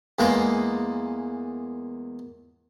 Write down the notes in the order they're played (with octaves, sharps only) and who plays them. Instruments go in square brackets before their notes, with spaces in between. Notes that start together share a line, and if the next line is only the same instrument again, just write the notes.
[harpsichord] E2 G#3 A#3 A#5 C6